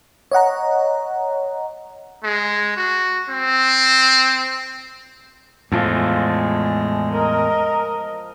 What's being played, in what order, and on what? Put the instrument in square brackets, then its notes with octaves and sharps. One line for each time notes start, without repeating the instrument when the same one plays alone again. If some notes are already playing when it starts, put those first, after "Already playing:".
[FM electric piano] C#5 D#5 F#5 A#5
[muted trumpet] G#3
F#4
C4
[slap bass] E2 A2 [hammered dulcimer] F3 A5 [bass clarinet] G#3
[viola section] A#4 D#5